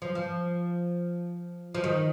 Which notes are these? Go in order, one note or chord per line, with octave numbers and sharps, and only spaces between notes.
F3
F3
F3
D#3